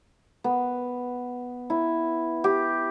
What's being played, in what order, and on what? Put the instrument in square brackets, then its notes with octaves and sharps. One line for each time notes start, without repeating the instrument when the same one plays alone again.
[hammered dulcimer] B3
E4
G4